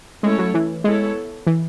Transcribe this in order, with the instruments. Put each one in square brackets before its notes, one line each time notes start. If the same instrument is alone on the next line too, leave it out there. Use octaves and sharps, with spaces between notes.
[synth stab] G#3 [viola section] A3 C#4 E4 A4 C#5
[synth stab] F#3
E3
[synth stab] G#3 [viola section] B3 E4 A4 C#5
[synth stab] E3